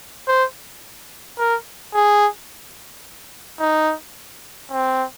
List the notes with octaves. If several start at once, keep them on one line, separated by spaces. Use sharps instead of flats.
C5
A#4
G#4
D#4
C4